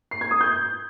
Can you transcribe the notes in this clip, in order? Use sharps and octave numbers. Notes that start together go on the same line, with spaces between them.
C7
G#6
D#6
G6